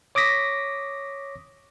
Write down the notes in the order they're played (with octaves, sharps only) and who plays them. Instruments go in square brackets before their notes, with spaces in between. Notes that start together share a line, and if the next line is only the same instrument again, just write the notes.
[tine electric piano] C#5 D6 D#6 A#6 B6